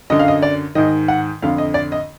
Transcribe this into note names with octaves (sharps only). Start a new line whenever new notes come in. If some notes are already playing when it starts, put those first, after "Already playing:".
F#2 D3 D#5
F5
D#5
D5
G#2 D#3 D#5
F#5
F2 D3 F5
D#5
D5
D#5